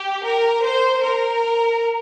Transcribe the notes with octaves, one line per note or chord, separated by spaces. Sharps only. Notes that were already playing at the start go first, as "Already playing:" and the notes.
Already playing: G4
A#4
C5
A#4